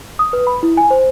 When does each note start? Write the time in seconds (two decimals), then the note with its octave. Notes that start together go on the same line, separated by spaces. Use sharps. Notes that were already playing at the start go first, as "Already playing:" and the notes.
0.19 D#6
0.33 B4
0.47 B5
0.63 E4
0.77 G#5
0.91 C5